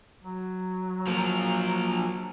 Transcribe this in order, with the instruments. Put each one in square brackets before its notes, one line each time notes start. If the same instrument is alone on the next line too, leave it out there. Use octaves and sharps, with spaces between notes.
[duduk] F#3
[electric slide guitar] F3 A#3